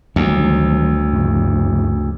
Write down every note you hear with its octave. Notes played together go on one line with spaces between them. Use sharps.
D2 D#3 F#3 G3
G2 C#3 F3